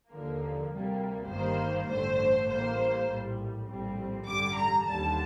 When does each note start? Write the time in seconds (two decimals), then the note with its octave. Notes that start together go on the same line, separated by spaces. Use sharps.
0.10 D#2 D3 F3 A#3
0.70 D2 C3 G3 A#3
1.29 G1 G2 D#3 G3 A#3 C5
1.89 A1 G2 D3 A3 C5
2.49 A1 A2 G3 A#3 C5
3.09 A#1 A2 G3
3.68 A#1 A2 G3 C4
4.28 A1 G2 D3 G3 D6
4.58 A#5
4.88 D#2 D3 G3 A5